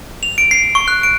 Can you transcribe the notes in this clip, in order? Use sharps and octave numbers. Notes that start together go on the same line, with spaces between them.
F7
D7
C7
C#6
F#6
D7